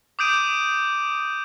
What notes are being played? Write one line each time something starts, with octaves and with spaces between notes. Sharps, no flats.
D6 D#6 G6 D7 D#7